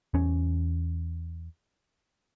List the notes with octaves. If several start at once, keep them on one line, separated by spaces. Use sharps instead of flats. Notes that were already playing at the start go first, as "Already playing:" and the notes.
E2 C#4